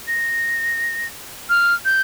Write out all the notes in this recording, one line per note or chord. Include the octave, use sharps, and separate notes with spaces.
A#6
F6
G6